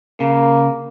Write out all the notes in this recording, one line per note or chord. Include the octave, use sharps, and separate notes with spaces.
C#3 A#3